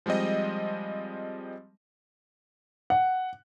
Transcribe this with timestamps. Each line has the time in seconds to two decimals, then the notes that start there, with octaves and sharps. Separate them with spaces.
0.06 F3 G3 G#3 C4 D#5
2.90 F#5